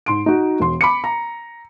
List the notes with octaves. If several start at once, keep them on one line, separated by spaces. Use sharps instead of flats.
G#2 C6 D7
D#4 F#4
E1 C6
B5 D6 C#7
A#5